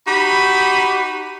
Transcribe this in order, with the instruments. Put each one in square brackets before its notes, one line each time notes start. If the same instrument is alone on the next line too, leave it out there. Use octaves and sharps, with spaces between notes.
[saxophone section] D#4 F#4 G4 [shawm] B5